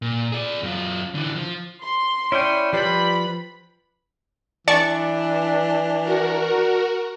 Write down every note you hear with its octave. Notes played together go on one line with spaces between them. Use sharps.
A#2
G#4 D5
F#2 F4
D3 E3
F3
C6
C#4 E4 D5 G5
F3 G3 B4 B5 C6
E3 D4 D5 A5 C#6
F#4 A#4